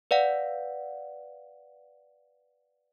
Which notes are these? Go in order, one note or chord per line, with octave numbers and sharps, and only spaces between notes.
B4 D5 F5 F#5